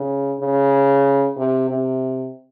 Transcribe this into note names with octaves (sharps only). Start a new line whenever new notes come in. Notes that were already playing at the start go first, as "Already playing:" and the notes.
Already playing: C#3
C#3
C3
C3